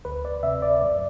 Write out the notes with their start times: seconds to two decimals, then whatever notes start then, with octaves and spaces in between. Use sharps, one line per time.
0.05 D2 B4
0.25 D5
0.43 C3 E5
0.62 D5
0.81 F#2 D5